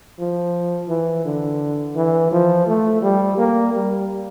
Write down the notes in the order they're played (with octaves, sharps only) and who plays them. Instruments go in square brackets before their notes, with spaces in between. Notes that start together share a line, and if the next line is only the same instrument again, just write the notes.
[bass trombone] F3
E3
D3
E3
F3
A3
G3
A#3
G3